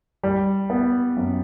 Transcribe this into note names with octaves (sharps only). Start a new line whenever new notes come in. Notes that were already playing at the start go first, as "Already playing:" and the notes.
G3
B3
F#2